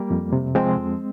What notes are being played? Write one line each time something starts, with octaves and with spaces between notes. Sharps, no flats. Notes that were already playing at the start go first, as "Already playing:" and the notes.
Already playing: G3 A#3
F2
C3
F3 G#3 C4
F2